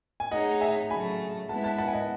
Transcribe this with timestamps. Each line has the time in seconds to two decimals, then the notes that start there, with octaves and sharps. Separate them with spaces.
0.20 G#5
0.31 A3 D#4 G#4 C#5 D#5 F#5
0.61 E5 G#5
0.90 C#3 F#3 A3 G#5 B5
1.49 G#3 B3 E4 B4 E5 F#5 A5
1.64 F#5 A5
1.78 F#5 A5
1.88 G#5
1.93 D#5 F#5